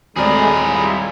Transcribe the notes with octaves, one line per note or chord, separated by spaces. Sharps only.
D#1 G#3 A3 C4 G#4 A#4 D5 B5
G3 E4 F4